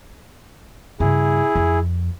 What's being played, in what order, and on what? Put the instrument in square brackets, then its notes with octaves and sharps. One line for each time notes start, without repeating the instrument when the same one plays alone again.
[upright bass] G2 C#3 [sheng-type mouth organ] E4 G#4
[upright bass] F2